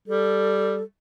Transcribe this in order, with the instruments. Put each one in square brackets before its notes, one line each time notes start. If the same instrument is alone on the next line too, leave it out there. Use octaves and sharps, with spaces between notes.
[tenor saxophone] G3 [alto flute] A4